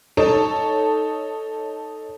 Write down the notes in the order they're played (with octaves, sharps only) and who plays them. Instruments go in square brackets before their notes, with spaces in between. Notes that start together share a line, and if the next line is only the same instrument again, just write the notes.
[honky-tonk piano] D#4 A4 C#5 A5